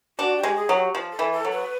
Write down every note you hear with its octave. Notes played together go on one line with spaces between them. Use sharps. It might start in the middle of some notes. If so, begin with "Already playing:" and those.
D4 F#4
G4
G#3
G#4
F#3
G4
F3
A4
E3
A4
F#3
B4